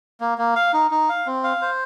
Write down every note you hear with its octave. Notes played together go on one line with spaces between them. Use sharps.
A#3
A#3
F5
D#4
D#4
F5
C4
F5
C5